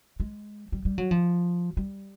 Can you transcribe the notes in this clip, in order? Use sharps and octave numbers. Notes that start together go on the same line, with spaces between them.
G#3
G3
G3
F#3
F3
G3